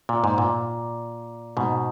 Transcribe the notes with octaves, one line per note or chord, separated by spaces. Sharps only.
A#2
G#2
A#2
G#2 B2